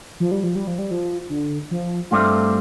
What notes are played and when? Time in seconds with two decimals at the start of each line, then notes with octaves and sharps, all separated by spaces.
0.20 F3
0.31 G3
0.43 F3
0.56 G3
0.67 F3
0.79 G3
0.91 F3
1.29 D3
1.71 F3
2.11 G2 G3 A3 C4 F4